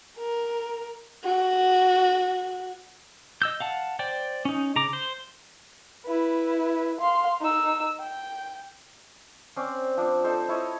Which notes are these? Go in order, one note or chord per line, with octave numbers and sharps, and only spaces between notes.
A#4
F#4
D#5 E6 G6
F5 F#5 A5
C5 D5 G5
C#4 D#4
C#3 A#5 D6
C5
E4 B4
F5 C6
D#4 E6
G5
C4 C#4 D5 C6
F3 D4
D#4 A4 C5
E4 C#5 D#5